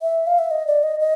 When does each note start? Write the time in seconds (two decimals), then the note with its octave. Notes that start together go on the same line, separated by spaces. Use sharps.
0.02 E5
0.27 F5
0.39 E5
0.51 D#5
0.67 D5
0.83 D#5
1.00 D#5